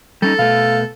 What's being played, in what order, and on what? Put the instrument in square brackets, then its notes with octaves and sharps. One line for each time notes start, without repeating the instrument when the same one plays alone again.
[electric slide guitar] G3 C#4 D#4 [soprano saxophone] A4
[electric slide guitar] B2 A3 [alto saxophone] F5